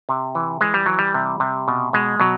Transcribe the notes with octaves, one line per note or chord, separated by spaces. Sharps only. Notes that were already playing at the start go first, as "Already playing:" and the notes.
C3
E3
E3 G#3
G3
E3 F#3
G3
C3
C3
B2
B2 G#3
B2 F#3